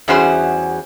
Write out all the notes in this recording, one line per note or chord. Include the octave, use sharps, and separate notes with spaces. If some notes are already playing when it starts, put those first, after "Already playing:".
E2 G3 C#4 F#4 G#4 C5